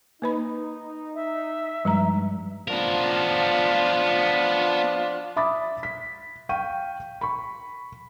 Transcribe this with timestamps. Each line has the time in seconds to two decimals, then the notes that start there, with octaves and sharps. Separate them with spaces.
0.22 A#3 D#4 B4 B5
1.15 E5
1.85 G2 F3 G#3 A#5
2.68 F3 B3 D4 F4 A#4
5.36 E5 B5 D6 D#6 A6
5.83 B6
6.49 F5 G5 C#6 D#7
7.21 B5 C#6